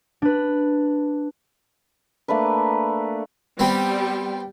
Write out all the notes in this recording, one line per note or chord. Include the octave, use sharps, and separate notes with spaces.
D4 B4
A3 A#3 D4 B4
G3 B3 C4 G5